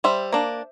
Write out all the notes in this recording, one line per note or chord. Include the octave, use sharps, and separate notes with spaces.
G3 C5 E5
A#3 D4